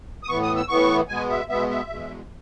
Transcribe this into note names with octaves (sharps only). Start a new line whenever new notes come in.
D#6
A2 E3 B3 C#6
D#6
E6
A2 E3 B3 C#6
B2 G#3 B3 G#5
E5
B2 G#3 B3 E5
E5
E2 B2 G#3